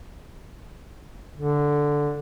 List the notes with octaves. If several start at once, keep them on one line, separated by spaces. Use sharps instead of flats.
D3